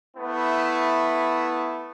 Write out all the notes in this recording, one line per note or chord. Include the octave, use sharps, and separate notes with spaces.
A3 B3 E4